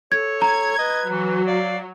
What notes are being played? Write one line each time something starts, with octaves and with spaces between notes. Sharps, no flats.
A4 C#5 G#6
A#5 G#6
B4 D#5
E3 F#3
D5 F5